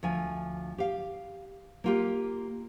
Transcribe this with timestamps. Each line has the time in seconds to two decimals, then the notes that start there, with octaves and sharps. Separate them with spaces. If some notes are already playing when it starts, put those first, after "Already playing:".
0.03 D2 F3 G#5
0.78 G4 F5
1.84 A#3 F4 G4